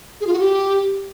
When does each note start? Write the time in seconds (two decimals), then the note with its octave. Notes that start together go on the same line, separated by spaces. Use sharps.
0.21 G#4
0.27 F4
0.33 F#4
0.39 G4